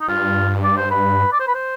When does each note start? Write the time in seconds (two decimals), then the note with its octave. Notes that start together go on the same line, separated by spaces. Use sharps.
0.01 D#4
0.08 G2 F4
0.64 D5
0.77 C5
0.91 B4
1.32 D5
1.40 C5
1.48 B4
1.55 C5